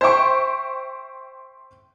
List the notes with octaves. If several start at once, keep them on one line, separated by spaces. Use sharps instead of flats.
C5 E5 G5 C#6